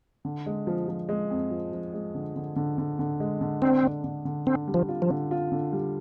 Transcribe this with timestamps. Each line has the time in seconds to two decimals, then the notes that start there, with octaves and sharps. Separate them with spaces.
0.25 D3
0.46 G#3
0.67 F3
0.88 F3
1.09 G#3
1.31 F2
1.51 F3
1.73 F3
1.93 G#3
2.15 D3
2.36 D3
2.56 D3
2.78 D3
2.99 D3
3.20 G#3
3.41 D3
3.62 C4 D4
3.83 D3
4.04 D3
4.25 D3
4.46 D3 C4
4.68 G3
4.74 F3
4.89 F4
5.02 F3
5.10 D3
5.31 F4
5.52 D3
5.73 G3